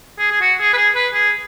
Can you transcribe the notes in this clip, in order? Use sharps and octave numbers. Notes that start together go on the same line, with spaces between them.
G#4
G#4
F#4
G#4
B4
G#4
B4
G#4